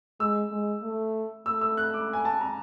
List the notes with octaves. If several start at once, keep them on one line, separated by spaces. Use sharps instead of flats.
G#3 E6
G#3
A3
A3 E6
E6
F#6
D6
G#5
A5
A#5